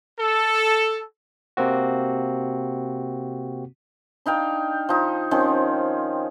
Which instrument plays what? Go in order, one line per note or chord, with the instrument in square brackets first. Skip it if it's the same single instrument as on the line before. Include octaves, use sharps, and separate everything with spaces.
[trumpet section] A4
[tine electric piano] C3 A#3 C4 F#4
[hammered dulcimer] D4 D#4 F5 G5
F3 D#4
D#3 F3 C4 C#4